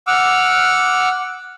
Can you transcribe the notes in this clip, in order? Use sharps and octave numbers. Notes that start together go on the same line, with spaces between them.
F#5 D6 E6 F6